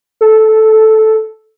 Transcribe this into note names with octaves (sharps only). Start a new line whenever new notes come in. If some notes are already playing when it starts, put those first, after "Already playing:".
A4